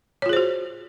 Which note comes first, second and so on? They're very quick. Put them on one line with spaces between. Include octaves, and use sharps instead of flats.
C#5 F4 G#4 C5 F#4